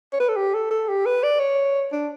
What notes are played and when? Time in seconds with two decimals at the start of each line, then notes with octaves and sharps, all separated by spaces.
0.13 C#5
0.20 B4
0.29 A4
0.36 G4
0.54 A4
0.70 A4
0.88 G4
1.06 B4
1.23 D5
1.39 C#5
1.92 D4